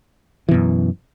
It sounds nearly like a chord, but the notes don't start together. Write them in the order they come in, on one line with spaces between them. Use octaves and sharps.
E3 B2 F#2